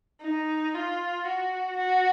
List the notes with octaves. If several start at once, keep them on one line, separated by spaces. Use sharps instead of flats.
D#4
F4
F#4
F#4